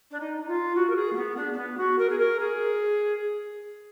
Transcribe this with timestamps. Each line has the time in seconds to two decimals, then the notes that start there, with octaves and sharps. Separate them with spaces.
0.11 D4
0.20 D#4
0.41 D#4
0.48 F4
0.75 F#4
0.89 A#4
0.95 G#4
1.12 A#3
1.16 B3
1.36 D4
1.53 D4
1.57 B3
1.77 F#4
1.98 A#4
2.09 G#4
2.18 A#4
2.39 G#4